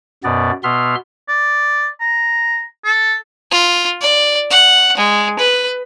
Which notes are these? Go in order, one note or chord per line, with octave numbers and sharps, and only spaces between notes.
F#2 B2 B3 D5
B2 B3 E5 C6 F6
D5
A#5
A4
F4
D5
F#5
G#3
B4